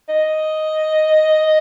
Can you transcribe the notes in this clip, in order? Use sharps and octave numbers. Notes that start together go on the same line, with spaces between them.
D#5